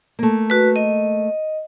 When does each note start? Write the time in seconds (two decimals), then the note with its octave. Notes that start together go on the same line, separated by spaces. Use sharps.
0.19 A3 A#3
0.50 F#4 B4
0.76 D#5